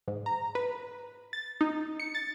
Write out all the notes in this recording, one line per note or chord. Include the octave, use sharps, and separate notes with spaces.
G#2
A#5
B4
A6
D#4
C#7
A6